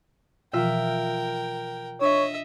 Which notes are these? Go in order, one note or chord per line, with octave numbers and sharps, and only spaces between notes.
B2 E3 F3 F4 A#4 E5 G5
D4 C#5 D#5 E5